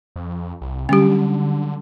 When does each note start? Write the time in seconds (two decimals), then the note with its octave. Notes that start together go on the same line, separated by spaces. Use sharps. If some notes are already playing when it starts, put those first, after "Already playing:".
0.16 F2
0.61 C2
0.89 D3 F#3 G3 C#4 G4